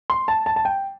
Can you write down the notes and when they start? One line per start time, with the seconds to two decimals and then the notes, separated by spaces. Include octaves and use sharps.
0.10 C6
0.28 A5
0.46 A5
0.56 A5
0.65 G5